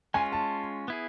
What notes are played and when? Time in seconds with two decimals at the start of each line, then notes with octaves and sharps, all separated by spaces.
0.14 G#3 C#4 F4 G#5
0.32 A5
0.88 B3 E4 G#4